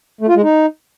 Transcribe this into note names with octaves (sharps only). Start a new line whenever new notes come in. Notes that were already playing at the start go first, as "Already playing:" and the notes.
A3
F4
G#3
D#4